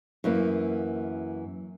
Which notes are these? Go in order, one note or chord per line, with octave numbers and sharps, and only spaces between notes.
F#2 E3 A#3